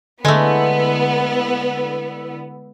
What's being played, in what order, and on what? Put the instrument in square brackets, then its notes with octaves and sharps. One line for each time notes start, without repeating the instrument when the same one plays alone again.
[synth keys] D3 E4 E6 [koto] G#3 A3 [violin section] B3